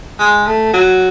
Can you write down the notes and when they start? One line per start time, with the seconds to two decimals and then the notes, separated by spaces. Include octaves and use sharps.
0.19 G#3
0.47 A3
0.74 F#3